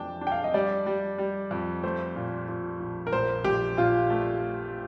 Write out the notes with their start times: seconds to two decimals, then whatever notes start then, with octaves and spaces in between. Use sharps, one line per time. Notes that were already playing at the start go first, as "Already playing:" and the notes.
Already playing: F2 D4 G5 A5
0.21 D4
0.27 G5
0.32 F5
0.44 D#5
0.54 G3 D5
0.86 G3
1.18 G3
1.51 F2
1.83 A3 C5
2.16 A#2
2.48 A#2
2.80 A#1
3.07 A#4
3.13 A#1 C5
3.44 A#1 G4
3.77 A#2 F4
4.10 A3